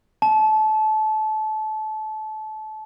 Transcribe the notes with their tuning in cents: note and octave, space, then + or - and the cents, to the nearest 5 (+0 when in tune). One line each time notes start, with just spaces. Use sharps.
A5 -25